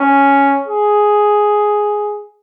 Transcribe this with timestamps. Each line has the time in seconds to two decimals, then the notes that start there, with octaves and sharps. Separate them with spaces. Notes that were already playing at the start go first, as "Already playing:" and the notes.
Already playing: C#4
0.67 G#4